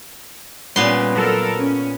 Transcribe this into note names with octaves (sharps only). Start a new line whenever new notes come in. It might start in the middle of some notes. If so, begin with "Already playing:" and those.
A#2 G3 B3 C#4 C6
F#3 A4 A#4
C#4